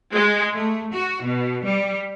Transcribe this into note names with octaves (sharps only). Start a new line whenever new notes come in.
G#3
A3
F#4
B2
G3